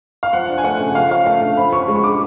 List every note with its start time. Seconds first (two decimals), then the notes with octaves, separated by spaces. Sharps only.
0.23 F5
0.33 F3 F#5
0.49 D4
0.58 G#5
0.64 A3 F#5
0.80 C#3 F#5
0.95 F3 F5
1.11 C#4 F5
1.26 A3 F5
1.42 D3
1.57 F3 B5
1.73 C#4 C#6
1.88 G#3
1.95 C#6
2.04 D3 D6